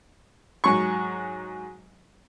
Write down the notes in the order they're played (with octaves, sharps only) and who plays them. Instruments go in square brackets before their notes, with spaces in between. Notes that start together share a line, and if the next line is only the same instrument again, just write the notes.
[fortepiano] G#2 F#3 C#6